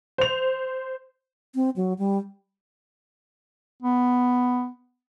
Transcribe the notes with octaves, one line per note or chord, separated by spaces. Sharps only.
C5 F7
C4
F#3
G3
B3